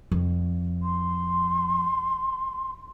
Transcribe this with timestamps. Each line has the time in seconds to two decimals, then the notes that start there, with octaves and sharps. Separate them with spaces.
0.12 F2
0.83 C6